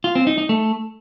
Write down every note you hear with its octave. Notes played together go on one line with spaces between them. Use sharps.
F4
C4
D#4
D#4
A3